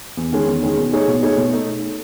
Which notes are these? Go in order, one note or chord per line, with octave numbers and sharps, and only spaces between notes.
E2
D#3 G#3 C#4
E2
D#3 G#3 C#4
B2
A3 D#4 G#4 C#5
B2
A3 D#4 G#4 C#5
B2
A3 D#4